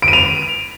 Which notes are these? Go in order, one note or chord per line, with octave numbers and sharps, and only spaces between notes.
D7
D#7
F7